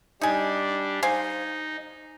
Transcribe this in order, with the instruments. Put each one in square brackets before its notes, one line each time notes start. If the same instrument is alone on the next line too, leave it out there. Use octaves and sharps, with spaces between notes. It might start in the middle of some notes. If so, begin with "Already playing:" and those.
[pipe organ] G3 D4 [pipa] D#4 G#5
[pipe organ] D#4 [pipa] C5 F5 G#5